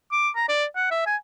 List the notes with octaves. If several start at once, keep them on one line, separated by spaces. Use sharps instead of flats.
D6
A#5
D5
F#5
E5
G#5